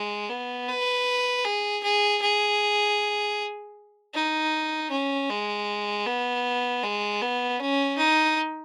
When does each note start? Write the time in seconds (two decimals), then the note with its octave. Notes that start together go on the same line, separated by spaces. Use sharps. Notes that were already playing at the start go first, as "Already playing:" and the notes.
Already playing: G#3
0.29 B3
0.68 B4
1.45 G#4
1.83 G#4
2.21 G#4
4.14 D#4
4.91 C#4
5.30 G#3
6.06 B3
6.83 G#3
7.22 B3
7.60 C#4
7.98 D#4